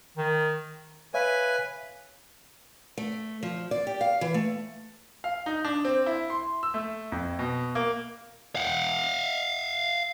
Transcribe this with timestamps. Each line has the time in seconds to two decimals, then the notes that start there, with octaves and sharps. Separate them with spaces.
0.17 D#3
1.14 B4 C#5 E5 F5 G#5
2.98 A3
3.43 F3
3.71 D5
3.87 G4
4.01 F5
4.21 E3
4.34 A3
5.24 F5
5.46 D#4
5.65 D4
5.85 C4
6.06 E4
6.30 C6
6.63 E6
6.74 A3
7.12 F2
7.39 B2
7.75 A#3
8.55 F5 F#5